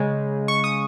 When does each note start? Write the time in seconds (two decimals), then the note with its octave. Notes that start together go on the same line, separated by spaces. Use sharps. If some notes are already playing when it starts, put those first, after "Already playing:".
Already playing: C#3 G#3
0.48 C#6
0.64 D#6